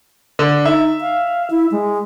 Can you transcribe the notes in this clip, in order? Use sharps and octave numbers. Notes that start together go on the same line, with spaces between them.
D3
D#4 E5
F5
E4
G#3